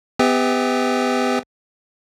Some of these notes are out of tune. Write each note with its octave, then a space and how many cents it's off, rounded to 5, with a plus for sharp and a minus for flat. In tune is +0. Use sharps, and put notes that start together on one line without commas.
B3 +30 G4 +35 E5 -35